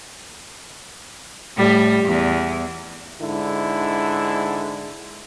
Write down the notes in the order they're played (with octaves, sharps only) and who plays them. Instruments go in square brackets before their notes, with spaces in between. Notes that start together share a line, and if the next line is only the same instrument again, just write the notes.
[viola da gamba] A2 G3
E2
[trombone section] G#2 D3 E4